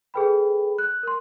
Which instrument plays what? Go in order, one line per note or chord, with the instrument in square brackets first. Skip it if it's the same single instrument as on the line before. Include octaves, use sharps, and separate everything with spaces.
[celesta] G#4 A4 B4 G5 B5
F#6
A#4 C6